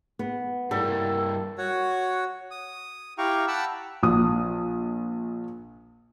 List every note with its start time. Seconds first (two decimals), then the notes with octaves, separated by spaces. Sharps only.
0.19 B3
0.71 G2 G3 E4 A4 A#4
1.58 F#4 C#5 F#5
2.51 D#6
3.18 E4 G4 F5 G5 A#5 C#6
3.48 F#5 G5 A5 B5 E6 F#6
4.03 A#1 D#6